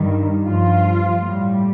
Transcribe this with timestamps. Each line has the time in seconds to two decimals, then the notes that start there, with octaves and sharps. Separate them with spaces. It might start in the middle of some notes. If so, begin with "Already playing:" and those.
Already playing: G2 D#3 G3
0.45 G2 F3 F4
1.20 A2 G3